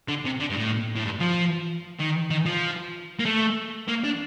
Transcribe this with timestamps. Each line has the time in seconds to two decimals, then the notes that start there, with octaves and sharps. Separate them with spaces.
0.08 D3
0.25 C3
0.40 D3
0.50 G2
0.56 A2
0.95 A2
1.04 G2
1.20 F3
1.99 D#3
2.30 D#3
2.46 F3
3.20 A#3
3.25 A3
3.88 A#3
4.04 D4